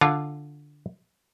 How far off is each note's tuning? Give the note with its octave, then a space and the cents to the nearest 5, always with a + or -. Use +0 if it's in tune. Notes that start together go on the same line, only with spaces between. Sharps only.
D3 +0 F4 +0